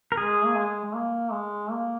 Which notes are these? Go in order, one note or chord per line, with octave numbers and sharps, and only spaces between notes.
A#4
G#3 G#4
A#3
G#3
G#3
A#3
G#3
A#3